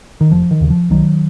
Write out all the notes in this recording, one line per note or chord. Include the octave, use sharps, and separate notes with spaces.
D#3
F1 F3
D#3
D#2 C#3
F3
C2 D#3 F#3